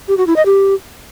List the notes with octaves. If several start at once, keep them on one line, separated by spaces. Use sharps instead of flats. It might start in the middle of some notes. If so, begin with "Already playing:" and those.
G4
F#4
E4
D#5
G4